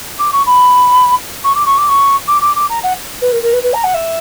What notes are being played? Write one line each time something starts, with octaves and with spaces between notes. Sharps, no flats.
D6
C#6
B5
C#6
D6
C#6
D6
C#6
D6
D6
D6
A#5
F#5
B4
A#4
A#4
B4
B4
A#5
F#5
E5